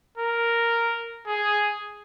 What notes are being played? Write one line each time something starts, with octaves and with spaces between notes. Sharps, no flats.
A#4
G#4